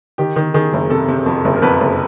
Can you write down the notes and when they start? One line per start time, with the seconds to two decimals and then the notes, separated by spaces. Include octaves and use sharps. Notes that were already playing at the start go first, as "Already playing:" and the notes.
0.18 D#3 G4
0.36 D#3
0.54 D#3 G#4
0.73 F#1
0.90 C3 A4
1.08 C3
1.26 F2
1.45 F#1
1.56 A#4
1.62 F2 B4
1.81 F#1